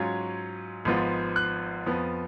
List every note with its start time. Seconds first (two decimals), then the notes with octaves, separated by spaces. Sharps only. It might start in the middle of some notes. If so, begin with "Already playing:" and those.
Already playing: G#2 F#3 C#4 F4 G#6
0.85 G#1 G#2 F3 B3 F4
1.36 F#6
1.86 F2 F3 B3